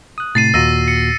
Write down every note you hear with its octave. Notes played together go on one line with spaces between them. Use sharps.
D#6 F#6
A2 C3 A3 A6 C7 D#7
D#2 A#2 F#4 E6 A#6 D#7
C#7